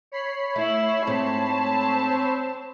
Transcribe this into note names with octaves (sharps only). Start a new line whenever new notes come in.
C#5 B5 C7
A3 E4
G#2 A3 C4 A5